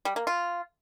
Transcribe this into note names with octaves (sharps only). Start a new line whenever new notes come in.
G3
A#3
F4